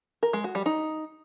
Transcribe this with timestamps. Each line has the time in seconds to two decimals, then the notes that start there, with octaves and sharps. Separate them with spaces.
0.23 A#4
0.33 G#3
0.44 F#4
0.55 G3
0.66 D#4